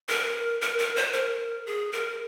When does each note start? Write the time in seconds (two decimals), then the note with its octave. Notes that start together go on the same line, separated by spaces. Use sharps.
0.09 A#4
0.62 A#4
0.79 A#4
0.96 C5
1.13 A#4
1.66 G#4
1.92 A#4